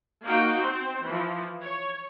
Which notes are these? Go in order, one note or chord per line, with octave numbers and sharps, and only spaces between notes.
A#3 D#4 F#4 F5 G5
C4 C5
E3 F3
C#5